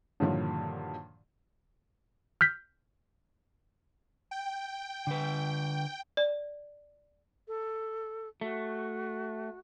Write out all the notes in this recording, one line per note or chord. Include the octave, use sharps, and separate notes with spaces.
G2 A#2 D3 D#3 F3 F#3
F6 G6 B6
G5
D3 B4
D5
A4
A3 F#4